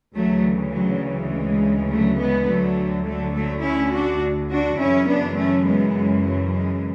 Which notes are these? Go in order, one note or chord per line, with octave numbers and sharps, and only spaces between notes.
D2 C#3 E3 F#3 A3
F#3
G#3
F#3 A3
G#3 B3
D2 D3 F#3 A3
F#3 A3
F#3 A3
C#4 E4
D4 F#4
D4 F#4
F#2 C#3 E3 C#4 E4
B3 D4
A3 C#4
G#3 B3
G#3
F#3
G#3